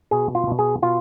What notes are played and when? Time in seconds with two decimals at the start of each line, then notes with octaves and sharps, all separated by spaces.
0.11 B2 G#4
0.35 F4
0.47 B2
0.59 G#4
0.82 B2 F4